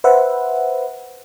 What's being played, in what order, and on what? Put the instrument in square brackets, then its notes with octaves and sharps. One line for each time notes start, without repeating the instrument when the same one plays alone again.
[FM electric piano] B4 C5 E5 F#5